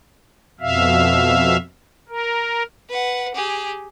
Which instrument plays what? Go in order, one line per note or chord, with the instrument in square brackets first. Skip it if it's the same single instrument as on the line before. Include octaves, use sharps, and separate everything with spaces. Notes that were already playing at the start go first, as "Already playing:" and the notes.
[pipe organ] F2 B2 E5 F5
A#4
[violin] B4 F#5
G4 G#4